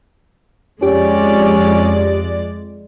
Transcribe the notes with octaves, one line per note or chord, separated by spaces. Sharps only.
F2 G#3 C#4 G4 D5